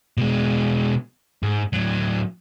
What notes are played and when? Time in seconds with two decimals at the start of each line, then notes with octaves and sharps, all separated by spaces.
0.18 B2 G#3
1.43 G#2
1.73 A2 F#3